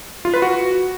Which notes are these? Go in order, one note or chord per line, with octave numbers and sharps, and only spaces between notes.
F4
B4
F#4